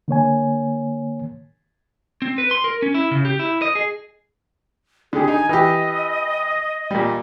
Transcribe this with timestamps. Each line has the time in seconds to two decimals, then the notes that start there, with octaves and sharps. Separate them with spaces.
0.08 D3 A#3 C#5 G#5
2.22 C4
2.38 B4
2.51 C6
2.64 A#4
2.82 C#4
2.95 E4
3.11 C#3
3.25 G4
3.39 E4
3.62 D#5
3.75 G#4
5.13 D3 G4 G#4
5.28 D#4 G#5
5.49 E3 G4 D#5
6.91 A#2 G3